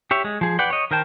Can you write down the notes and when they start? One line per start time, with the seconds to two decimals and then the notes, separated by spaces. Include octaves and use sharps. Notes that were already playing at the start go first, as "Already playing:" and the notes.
0.11 G4 C#5 E5
0.24 G#3
0.41 F3 G#4
0.59 B4 D5 F#5 G5
0.70 C#5 D#5
0.91 D#3 A#4 C5 G5 A5